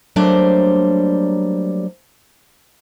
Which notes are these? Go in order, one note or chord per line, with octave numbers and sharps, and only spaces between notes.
F#3 G3 A3 A#3 D4 C5